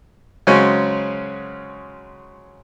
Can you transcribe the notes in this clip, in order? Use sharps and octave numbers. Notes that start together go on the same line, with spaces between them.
C#3 F#3 G#3 C4 C#4